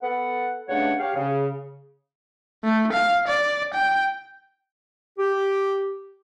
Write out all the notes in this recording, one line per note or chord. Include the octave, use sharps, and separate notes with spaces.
B3 A4 F#5
G2 C#3 A3 D4 C#5 F#5
G4 C#5 F5
C#3
A3
F5
D5
G5
G4